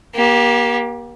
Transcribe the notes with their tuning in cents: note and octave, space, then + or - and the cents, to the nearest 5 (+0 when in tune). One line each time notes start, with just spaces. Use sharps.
A#3 +35 G4 +0